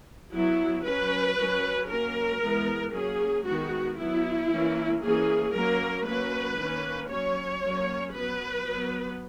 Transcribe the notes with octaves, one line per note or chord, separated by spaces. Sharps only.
F#3 B3 E4
F#3 C#4 B4
F#3 C#4
F#3 A#3 C#4 A#4
E3 G#3 B3
F#3 A#3 C#4 G#4
D#3 G#3 B3 F#4
F#3 B3 E4
E3 A#3 C#4
E3 A#3 C#4 G#4
F#3 A#3 C#4 A#4
F#3 A#3 C#4 B4
D#3 A#3 C#4
F#3 C#4 C#5
F#3 A#3 C#4
F#3 B3 B4
F#3 B3